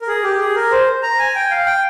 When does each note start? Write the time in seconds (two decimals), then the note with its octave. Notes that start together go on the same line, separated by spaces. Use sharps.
0.01 A#4
0.08 G#4
0.23 G4
0.39 G#4
0.55 A#4
0.72 C5
1.03 A#5
1.19 G#5
1.35 G5
1.51 F5
1.66 G5